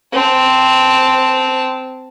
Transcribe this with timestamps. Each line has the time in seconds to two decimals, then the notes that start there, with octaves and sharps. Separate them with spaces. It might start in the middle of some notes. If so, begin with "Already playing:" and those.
0.13 C4 A5